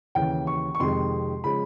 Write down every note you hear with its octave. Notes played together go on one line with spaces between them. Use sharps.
D#2 C#3 E3 G5
C#6
C#6
F2 C3 D#3 G#3 C6
C#3 F3 G#3 B5